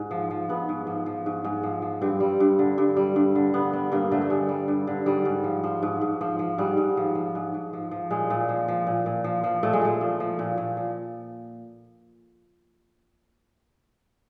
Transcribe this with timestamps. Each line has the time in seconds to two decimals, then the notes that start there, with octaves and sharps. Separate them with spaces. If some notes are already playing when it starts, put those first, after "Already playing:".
Already playing: G#2
0.11 F3
0.31 F3
0.49 G#2 B3
0.69 G#2
0.87 F3
1.06 F3
1.26 G#2
1.45 G#2
1.63 F3
1.82 F3
2.02 G2 C4
2.20 G3
2.40 G2
2.59 D3
2.78 G2
2.97 G3
3.16 G2
3.35 D3
3.54 G2 B3
3.73 G3 B3
3.92 G2 A#3
4.12 D3 A3
4.22 A3
4.30 G2 G#3
4.49 G3
4.68 G2
4.87 D3
5.06 G#2 G3
5.25 G#2
5.44 F3
5.64 F3
5.83 G#2
6.01 G#2
6.21 F3
6.39 F3
6.58 G#2 G3
6.77 G#2
6.97 F3
7.15 F3
7.35 G#2
7.54 G#2
7.73 F3
7.91 F3
8.11 A#2 G#3
8.30 A#2
8.49 F3
8.68 F3
8.87 A#2
9.06 A#2
9.24 F3
9.44 F3
9.63 A#2 A3
9.73 G#3
9.81 A#2 A3
10.01 F3
10.20 F3
10.39 A#2
10.58 A#2
10.77 F3